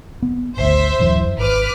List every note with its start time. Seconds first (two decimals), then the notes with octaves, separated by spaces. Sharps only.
0.22 B3
0.57 G#1 D2 C5 E5
0.99 D1 F#2 E3
1.38 G#1 B4 D6 F6